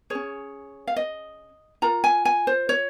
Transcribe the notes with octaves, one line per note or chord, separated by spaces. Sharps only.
C#4 G#4 C#5
F5
D#5
F4 A#4 A#5
G#5
G#5
C5
C#5